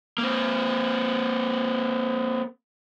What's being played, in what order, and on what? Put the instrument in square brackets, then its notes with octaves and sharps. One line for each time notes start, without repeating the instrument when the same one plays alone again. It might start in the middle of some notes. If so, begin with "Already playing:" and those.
[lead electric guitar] A#3 C4